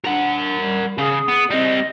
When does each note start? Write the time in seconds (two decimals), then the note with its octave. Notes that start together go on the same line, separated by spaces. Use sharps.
0.05 D4 A#4 F#5
0.60 G3
0.98 C#3 G#4
1.28 B3
1.50 G3 C4 D#5